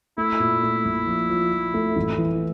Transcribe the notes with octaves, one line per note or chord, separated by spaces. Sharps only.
A3 E4
A#2
A3
A#1
F3
F3
F3
A3
A1
E3